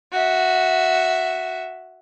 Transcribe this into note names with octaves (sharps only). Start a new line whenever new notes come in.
F#4 E5